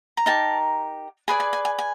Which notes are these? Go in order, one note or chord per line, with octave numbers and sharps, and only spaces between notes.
A#5
D#4 G4 A#4 A5
G#4 B4 D5 G#5
G#5
G#5
G#5
G#5